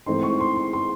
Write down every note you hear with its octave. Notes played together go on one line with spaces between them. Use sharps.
G#2 E3 A3 C4 D#4 C6
C#6
C6
C6
C6